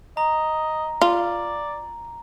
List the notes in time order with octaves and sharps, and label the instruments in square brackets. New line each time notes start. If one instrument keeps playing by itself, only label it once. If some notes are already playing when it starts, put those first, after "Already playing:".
[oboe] D#5 [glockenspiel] A#5
[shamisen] F4 [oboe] D5